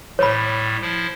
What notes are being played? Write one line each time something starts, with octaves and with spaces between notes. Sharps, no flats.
A2 G3 C#5 B5
F3 E4